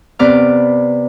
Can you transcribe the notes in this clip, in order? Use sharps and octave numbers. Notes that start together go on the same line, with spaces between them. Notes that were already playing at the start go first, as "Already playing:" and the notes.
C3 B3 B4 D5 D6 F6